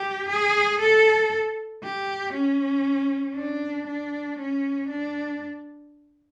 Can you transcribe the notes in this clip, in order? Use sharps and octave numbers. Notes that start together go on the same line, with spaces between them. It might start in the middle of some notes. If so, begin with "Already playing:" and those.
Already playing: G4
G#4
A4
G4
C#4
D4
D4
C#4
D4